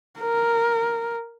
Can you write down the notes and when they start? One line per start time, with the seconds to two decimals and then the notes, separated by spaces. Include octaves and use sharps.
0.20 A#4